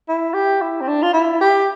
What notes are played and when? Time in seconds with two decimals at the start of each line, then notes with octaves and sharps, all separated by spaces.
0.09 E4
0.34 G4
0.61 E4
0.81 C4
0.88 D4
1.03 F4
1.14 E4
1.41 G4